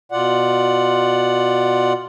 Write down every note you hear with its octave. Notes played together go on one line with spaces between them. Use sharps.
B2 F4 D5 F#5